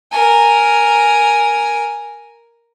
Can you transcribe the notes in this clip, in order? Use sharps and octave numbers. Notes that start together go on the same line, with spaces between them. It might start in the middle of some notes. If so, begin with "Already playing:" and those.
A#4 G#5